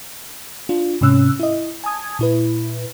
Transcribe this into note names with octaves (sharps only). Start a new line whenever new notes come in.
D4 F4
G#2 C3 C#4 E6 F#6
E4 D#5
G#5 A5 D#6 G#6
A#2 E4 B4